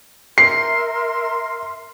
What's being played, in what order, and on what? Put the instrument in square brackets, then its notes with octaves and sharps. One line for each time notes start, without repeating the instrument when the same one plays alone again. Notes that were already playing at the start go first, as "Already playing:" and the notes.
[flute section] A#4 E5 C6 [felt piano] C7